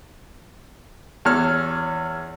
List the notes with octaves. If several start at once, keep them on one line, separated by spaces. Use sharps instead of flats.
E2 C#5 F6